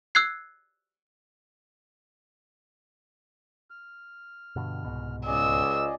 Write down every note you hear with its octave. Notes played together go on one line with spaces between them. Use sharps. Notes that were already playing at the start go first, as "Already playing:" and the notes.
E6 F#6 G#6 C7
F6
G2 B2 D3
C2 G#2 B2
C#2 G#4 D5 D#5 E6